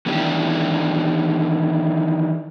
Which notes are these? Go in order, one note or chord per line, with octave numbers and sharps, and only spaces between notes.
D#3 E3 B3 D4 E4 G4